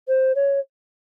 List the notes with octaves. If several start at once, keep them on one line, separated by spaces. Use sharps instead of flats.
C5
C#5